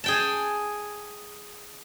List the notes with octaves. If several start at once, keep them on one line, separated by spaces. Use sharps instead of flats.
G#4 G5 A5